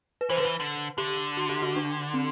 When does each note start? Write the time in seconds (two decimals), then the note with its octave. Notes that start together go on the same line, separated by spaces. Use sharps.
0.21 B4
0.30 E3 C5
0.37 D3 B4
0.45 E3
0.60 D3
0.98 D3 G4
1.37 F#4
1.50 G4
1.62 F#4
1.76 D4
2.14 C4